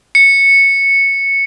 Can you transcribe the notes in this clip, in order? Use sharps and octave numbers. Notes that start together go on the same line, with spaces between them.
C#7